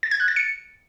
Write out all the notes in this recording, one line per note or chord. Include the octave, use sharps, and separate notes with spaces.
A6
G#6
F#6
A6
C#7